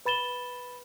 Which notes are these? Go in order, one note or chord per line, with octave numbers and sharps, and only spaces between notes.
B4 B5 A6 E7 G7